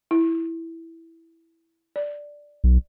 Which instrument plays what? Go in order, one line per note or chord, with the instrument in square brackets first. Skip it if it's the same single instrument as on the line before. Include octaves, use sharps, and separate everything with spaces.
[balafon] E4
D5
[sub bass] B1